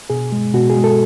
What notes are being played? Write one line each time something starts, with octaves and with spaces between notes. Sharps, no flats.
B2 G#4
G#3
B2 F#4
G#4
G#3
A4